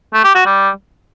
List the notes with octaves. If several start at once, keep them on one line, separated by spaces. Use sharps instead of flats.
A3
G4
F#4
G3